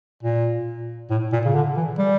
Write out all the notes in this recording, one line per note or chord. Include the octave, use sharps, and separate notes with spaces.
A#2
A2
A#2
C#3
D3
E3
G3